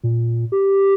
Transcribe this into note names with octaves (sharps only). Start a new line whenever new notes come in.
A#2
G4